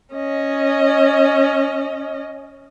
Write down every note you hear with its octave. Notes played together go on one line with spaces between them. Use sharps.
C#4 D#5